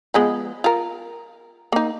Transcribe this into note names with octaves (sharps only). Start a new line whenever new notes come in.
F3 G#3 B3
F4 A#4
A#3 D#4